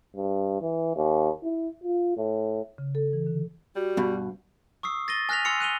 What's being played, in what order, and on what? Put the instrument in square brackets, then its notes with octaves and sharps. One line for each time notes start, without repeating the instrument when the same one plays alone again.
[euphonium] G2
E3
D#2
E4
F4
A2
[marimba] C#3
A4
E3
D3
[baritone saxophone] G3 [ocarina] F#4
[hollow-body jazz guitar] G2 B2
[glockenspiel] C#6 D#6 E6 C7
A6 A#6 D#7 G7
G#5 F6 F#6 A#6 B6 F7
G#5 C6 E6 C7 C#7 F7
F#6 D#7 F7 G7